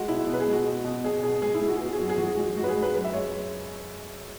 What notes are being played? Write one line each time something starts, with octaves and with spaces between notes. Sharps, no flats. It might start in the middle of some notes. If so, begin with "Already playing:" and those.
Already playing: G#3 F#4
B2 E4
B2
B4
G#4
G#3
F#4
B2
B2
B2 G#4
B2 G#4
G#3 G#4
E4
G#3
F#4
G#4
B3 F#4
G#4
F#2 F#4
G#4
E3 F#4
G#4
G#2 F#4
G#2 F#4
B4
G#4
G#2
B4
F#2 B4
E5
G#3 C#5